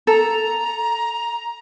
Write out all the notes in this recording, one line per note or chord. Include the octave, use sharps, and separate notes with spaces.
A4 A#5